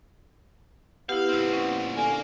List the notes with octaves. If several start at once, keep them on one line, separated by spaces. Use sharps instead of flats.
B3 E4 G4 F5
A#2 C4
C#4
D3 A#3 G#5